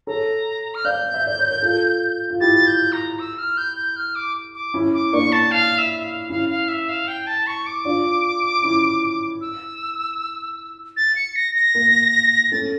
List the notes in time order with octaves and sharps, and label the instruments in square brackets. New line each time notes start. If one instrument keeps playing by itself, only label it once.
[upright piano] A4 C#5 [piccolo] A#5
[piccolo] F6
[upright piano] D5 F5 [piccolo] G6
[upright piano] E5
D5
C#5
A#4
F4 A4
F4
[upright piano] E4 G4 [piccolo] A6
[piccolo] G6
A#5
E6
F6
G6
G6
F6
D6
D6
[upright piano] C#4 E4
[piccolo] D6
[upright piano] A#3 D4 [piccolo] C#6
[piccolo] A5
F5
E5
F5
[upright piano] C#4 E4 [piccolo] F5
[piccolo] F5
E5
F5
G5
A5
C#6
D6
[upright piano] D4 F4
C#4 E4
[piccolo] E6
A6
C#7
A#6
A#6
[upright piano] A#3
[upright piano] A3 C#4 [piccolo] A6